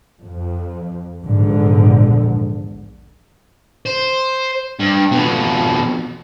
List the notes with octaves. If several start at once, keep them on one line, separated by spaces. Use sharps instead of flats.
F2
A#1 E2 G#2 D3
C5
G2
F2 B2